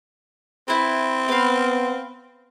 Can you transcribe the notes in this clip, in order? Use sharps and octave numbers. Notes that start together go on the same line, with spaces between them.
C4 E4 B4
B3 B4 F5